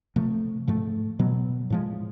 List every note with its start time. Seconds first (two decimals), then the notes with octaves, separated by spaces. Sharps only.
0.16 C3 F3 A3
0.68 G#2 F3 A3
1.19 B2 F#3 B3
1.70 A2 F3 G#3